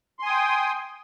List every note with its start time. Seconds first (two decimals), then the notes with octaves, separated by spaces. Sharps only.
0.19 C6
0.23 G#5
0.26 D#6
0.29 G5